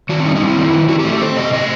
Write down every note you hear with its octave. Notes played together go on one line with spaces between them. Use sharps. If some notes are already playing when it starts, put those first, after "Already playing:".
D#3 F#4
C4
G3 D#4
C4 D#4
E4
D#3
D#3
D#3 F#4
G4
A3
A4
C4 C5
C3 D#5
A3 D#5